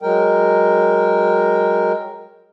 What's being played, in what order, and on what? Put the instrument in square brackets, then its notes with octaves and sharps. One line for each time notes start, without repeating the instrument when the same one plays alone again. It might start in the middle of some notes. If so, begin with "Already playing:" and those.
[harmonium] F#3 G#3 A#4 G5